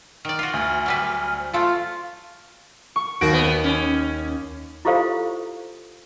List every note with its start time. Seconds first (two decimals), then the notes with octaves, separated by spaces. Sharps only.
0.25 D#3 D5 F6
0.39 F4 F#4
0.53 D2
0.86 F#3 G3 B4
1.39 C5
1.53 A3 F4 A4
2.96 C#6
3.21 D#2 F#4 A#6 D7
3.33 B3
3.64 C#4
4.85 E4 F4 G4 A4 C5 F5